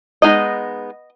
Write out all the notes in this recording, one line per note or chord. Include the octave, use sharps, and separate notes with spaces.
G#3 B3 D#4 D#5